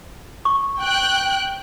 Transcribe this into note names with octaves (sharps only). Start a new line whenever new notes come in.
C#6
G5 F#6